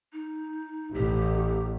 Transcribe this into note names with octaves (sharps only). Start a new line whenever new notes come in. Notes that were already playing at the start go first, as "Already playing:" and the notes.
D#4
A1 G4